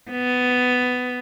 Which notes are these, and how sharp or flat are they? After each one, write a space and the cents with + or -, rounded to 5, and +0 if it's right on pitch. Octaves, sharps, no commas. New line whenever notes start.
B3 +15